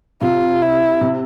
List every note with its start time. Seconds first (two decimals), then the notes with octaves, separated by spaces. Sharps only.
0.21 C3 F4
0.62 E4
1.01 C3